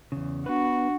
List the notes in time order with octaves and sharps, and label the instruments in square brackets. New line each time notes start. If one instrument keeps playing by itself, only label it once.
[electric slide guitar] E2 C#3
[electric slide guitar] B3 B4 [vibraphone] D4 [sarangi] F#4